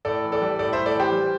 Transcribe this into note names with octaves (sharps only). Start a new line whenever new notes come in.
A2 A4 D5
E3
A4 D5
G3
A2 A4 D5
A2 C5 E5
A4 D5
E3 G4 C5
G3